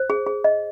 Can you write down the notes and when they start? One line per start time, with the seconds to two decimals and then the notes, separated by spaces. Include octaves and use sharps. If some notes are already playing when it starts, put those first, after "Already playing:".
Already playing: C5
0.10 G#4
0.27 G#4
0.44 D#5